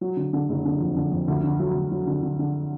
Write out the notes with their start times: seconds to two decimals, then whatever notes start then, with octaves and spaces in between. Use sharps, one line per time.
0.01 F#3
0.17 D3
0.33 D3
0.49 F#1
0.65 D3
0.80 F2
0.96 D3
1.12 F2
1.28 D2
1.44 D3
1.59 F#3
1.75 D2
1.92 F#3
2.07 D3
2.23 D3
2.39 D3